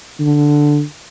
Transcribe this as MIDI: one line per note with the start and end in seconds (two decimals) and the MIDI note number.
0.20 0.81 50